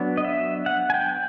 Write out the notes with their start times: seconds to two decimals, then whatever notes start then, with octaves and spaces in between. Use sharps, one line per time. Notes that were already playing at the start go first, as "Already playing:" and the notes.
Already playing: F#3 B3 D4
0.17 D#5
0.24 E5
0.66 F#5
0.90 G#5
0.94 G5